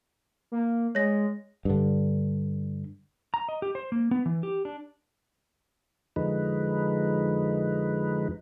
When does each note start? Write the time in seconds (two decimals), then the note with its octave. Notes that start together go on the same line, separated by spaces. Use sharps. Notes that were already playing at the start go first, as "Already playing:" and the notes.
0.52 A#3
0.95 G#3 C#5 A#6
1.65 G2 D3
3.34 A#5
3.49 D#5
3.62 G4
3.75 C5
3.92 A#3
4.11 B3
4.26 E3
4.43 G4
4.65 D4
6.16 F2 D3 F3 G#3 D#4 B4